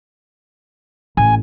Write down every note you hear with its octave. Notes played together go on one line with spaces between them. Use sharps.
A1 G#5